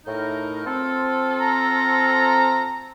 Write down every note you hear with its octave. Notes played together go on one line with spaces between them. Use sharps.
A2 D#4 A#4
C4 F4 A4
A#5